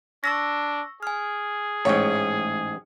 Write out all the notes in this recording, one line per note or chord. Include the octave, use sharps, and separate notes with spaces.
D4 C#6 E6 A#6
G#4 G#5 F6
A1 G#2 C#5